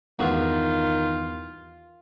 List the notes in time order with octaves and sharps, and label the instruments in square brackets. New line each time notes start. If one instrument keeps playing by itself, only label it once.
[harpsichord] E2 G2 F#4 [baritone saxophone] D#3 [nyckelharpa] F4